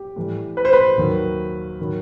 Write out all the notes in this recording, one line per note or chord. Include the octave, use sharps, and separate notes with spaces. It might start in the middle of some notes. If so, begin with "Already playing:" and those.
Already playing: G4
A2 E3 G3
B4
C5
B4
D#2 D#3 F#3
D#3 F#3